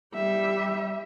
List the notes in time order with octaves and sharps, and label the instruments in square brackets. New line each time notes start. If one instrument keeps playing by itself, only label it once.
[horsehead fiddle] G3 E5